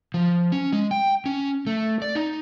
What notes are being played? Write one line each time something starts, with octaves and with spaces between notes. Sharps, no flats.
F3
C#4
G#3
G5
C#4
A3
D5
D#4